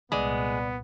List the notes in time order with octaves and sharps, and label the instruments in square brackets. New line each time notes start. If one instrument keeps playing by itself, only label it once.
[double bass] C2 A#2 [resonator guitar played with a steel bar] G#3 [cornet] B3 [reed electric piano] D5 B5